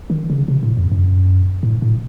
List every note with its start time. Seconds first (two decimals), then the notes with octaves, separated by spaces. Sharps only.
0.10 D#3
0.30 C#3
0.48 C3
0.63 A2
0.77 F2
0.92 F#2
1.63 A2
1.82 A2